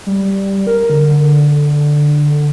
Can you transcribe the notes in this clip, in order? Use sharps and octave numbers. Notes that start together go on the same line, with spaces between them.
G3
A#4
D3